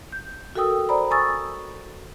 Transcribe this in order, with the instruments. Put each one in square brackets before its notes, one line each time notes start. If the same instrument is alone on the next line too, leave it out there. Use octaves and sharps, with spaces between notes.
[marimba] G6
F#4 A4 A#4 G5 D#6 E6
C5 D5 A#5 B5
G#5 C#6 D#6 E6 A6